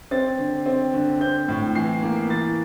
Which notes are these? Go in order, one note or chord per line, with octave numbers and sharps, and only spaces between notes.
C4 A6
D3
C4
D3
C4 G6
A2
E3 C7
A#3
E3 A6